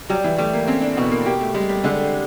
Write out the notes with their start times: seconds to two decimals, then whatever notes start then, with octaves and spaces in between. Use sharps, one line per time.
0.09 F#3 G3
0.24 E3
0.38 G3 A3
0.54 A#3
0.68 C4 C#4
0.82 D4
0.97 B2 B3
1.12 A#3
1.26 A#3 G4
1.41 A3
1.54 G3 G#3
1.69 G3
1.84 D3 G#3